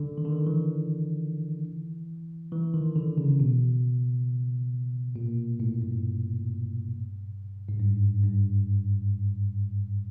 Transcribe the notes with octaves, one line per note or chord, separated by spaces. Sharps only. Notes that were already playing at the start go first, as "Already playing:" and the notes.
Already playing: D3
D#3
D3
D#3
E3
E3
D#3
D3
C#3
B2
A#2
A2
G2
G#2
G2
G2